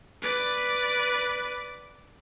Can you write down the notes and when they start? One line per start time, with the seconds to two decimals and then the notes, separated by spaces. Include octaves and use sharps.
0.22 B4 D5